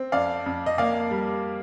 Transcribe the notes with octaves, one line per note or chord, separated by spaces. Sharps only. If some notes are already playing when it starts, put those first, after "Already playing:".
Already playing: C4
F2 D5 F5
F2
D#5
A#3 D5 F5
G3